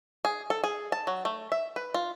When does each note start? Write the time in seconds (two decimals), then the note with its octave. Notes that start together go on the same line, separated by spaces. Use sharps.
0.25 G#4
0.50 A4
0.64 G#4
0.92 A5
1.07 F#3
1.25 A3
1.52 E5
1.76 B4
1.94 F4